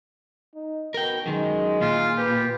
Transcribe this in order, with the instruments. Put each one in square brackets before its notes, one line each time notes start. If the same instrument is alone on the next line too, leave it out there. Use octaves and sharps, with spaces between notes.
[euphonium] D#4
[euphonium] B2 [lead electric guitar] A#4 G5
[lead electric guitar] F#2 D#3 [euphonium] G#3
[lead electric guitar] A#2 [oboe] F4
[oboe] G4 [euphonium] B4